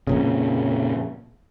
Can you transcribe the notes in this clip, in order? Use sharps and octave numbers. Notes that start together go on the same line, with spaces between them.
F2 A#2 C#3